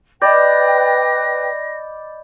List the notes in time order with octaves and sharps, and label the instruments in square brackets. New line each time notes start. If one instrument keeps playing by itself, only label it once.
[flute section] B4 G5 [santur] D5 [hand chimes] D#5 B5 G6 [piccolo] A#6